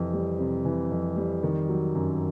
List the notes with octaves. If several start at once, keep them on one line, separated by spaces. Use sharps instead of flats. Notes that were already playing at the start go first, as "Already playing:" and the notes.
Already playing: F2 C3 E3
G3
C3
E3
F2
G3
D#3
F#3
F#2